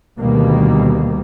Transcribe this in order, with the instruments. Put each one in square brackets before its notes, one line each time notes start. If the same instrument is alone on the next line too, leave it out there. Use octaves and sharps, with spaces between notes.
[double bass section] D2 B2 D#3 G3 A#3